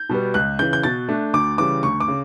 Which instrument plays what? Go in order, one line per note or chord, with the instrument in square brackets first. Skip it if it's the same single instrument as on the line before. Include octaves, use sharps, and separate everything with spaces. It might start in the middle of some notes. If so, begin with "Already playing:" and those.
Already playing: [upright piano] G6
B2 G3 B3
C#2 F#6
C#3 E3 G6
G6
B2 A6
A3 D4
D2 D6
C#3 E3 G3 D6
D2 C#6
D6
C#3